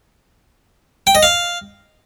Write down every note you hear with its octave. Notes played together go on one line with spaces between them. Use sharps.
G5
D#5
F5